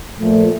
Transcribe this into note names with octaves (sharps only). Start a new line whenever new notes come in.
A#2 F3 A3